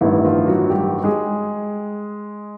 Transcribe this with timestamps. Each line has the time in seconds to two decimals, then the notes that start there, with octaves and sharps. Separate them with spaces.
0.01 A1 G2 D#3 E4
0.25 F3 F4
0.47 F#3 F#4
0.70 G3 G4
1.04 G#3 G#4